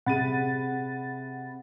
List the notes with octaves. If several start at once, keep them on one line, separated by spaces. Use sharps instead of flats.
C3 G#4 F#5 B5 A6 D#7